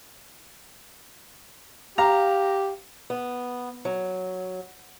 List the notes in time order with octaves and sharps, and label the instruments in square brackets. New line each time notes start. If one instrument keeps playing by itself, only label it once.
[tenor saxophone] G4 [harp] F5 [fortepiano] A#5
[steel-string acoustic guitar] B3
F#3